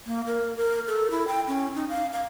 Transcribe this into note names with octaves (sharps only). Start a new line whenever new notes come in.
A#3
A#4
A#4
A4
E4
G5
C#4
D#4
F5
F5